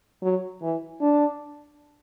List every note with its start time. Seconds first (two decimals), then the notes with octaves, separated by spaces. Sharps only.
0.22 F#3
0.62 E3
1.01 D4